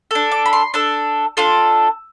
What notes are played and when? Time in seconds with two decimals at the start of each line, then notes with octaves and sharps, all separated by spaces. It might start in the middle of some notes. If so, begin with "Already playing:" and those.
0.11 D4 A4
0.32 D6
0.46 B5
0.53 C6
0.74 D4 A4 E6
1.37 D4 F4 A4